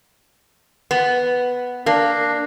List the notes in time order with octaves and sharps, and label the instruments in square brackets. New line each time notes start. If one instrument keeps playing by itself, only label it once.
[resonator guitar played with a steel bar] B3
[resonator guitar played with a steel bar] A#3 [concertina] D4